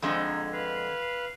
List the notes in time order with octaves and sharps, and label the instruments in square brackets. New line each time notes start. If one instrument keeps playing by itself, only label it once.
[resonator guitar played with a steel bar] F2 D3 G#3 [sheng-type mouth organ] C5
[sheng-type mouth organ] D#4
B4 F5